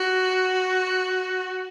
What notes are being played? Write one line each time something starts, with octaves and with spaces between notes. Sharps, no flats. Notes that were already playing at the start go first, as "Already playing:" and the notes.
Already playing: F#4